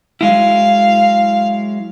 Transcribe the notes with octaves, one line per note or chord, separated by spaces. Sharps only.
F#3 G#3 E4 F5